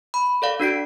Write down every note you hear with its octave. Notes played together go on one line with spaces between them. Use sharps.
B5
A4 D5 F5
D4 F#4 B6 D7